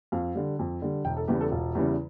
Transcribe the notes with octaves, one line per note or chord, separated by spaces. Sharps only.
F2 F5
D3 G3
F2
D3 G3
E1 G5
A4
E2 C#3 E3 G3 G4
A4
E1 F4
E2 C#3 E3 G3